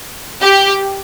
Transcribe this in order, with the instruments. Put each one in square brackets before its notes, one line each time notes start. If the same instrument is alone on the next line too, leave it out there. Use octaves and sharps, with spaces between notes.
[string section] G4